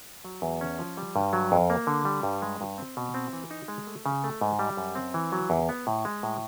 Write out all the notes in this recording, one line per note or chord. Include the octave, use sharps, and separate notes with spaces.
F#3
E2
C#4
F3
G3
G2
F#3
F2
A#3
D3
G3
G2
G#3
G2
C4
B2
C4
E3
D#4
G#3
A3
C#3
A3
G#2
G3
F#2
C4
E3
F#3
E2
B3
A2
G#3
A2